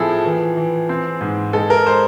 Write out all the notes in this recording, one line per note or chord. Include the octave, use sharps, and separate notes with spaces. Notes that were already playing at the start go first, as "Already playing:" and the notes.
Already playing: A2 F3 A3 C4 E4 G#4 A4
E3
E3
C4
G#2
G#3 A4
A#4
G#3 C5